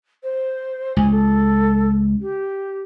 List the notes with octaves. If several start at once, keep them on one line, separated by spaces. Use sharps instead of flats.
C5
C#2 G#5
A4
G4